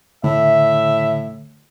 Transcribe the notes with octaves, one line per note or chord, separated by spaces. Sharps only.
A2 D3 E5